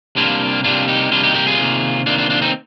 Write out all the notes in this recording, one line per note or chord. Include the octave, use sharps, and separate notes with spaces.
C3 G3 A#3 D4 F4
C3 G3 A#3 D4 F4
D#4 G4
C3 G3 A#3 D4 F4
D#4 G4
G4 A#4
F4 G#4
C3 D#3 A#3
C3 D#3 A#3 D4 F4
D4 F4
D4 F4
C4 D#4